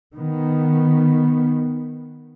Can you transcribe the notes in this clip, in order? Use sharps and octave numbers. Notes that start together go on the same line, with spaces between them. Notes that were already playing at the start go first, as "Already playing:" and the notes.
D#3 B3